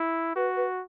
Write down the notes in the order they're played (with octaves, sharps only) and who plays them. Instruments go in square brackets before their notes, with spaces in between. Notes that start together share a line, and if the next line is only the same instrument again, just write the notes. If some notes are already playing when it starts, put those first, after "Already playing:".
Already playing: [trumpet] E4
[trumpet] F#4 [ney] B4
[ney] B4